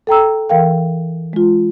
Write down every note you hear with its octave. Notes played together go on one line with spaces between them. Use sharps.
A4 G5 A#5 E6
E3 A#4 F5 G5
G#3 F4